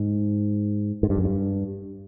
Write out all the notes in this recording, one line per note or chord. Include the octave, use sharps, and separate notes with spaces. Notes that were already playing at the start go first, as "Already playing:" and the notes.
Already playing: G#2
G#2
G2
F#2
G2